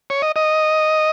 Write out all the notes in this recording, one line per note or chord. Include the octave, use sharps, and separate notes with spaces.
C#5
D#5
D#5